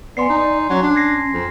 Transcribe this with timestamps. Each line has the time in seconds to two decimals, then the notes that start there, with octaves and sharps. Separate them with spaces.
0.17 B3 D5 G#5 C6 C7
0.29 D#4
0.70 F#3 C#4
0.82 D4
0.96 G#6 A#6 C7
1.33 F2